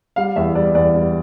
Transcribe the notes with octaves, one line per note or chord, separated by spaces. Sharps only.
G3 F5
E2 E5
G3 D5
E2 D5
G3